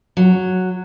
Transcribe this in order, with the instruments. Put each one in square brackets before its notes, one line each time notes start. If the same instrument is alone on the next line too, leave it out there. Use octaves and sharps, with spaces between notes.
[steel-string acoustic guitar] F#3